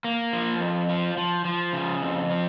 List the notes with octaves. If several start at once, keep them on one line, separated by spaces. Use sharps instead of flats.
A#3
F3
F2
F3
F3
F3
C#3
F2
F3